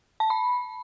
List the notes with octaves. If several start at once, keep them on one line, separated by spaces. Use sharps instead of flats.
A5
B5